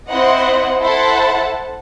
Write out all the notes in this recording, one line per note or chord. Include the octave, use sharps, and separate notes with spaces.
C4 E4 C5 D#5 F#5
E4 A4 C5 F#5 A5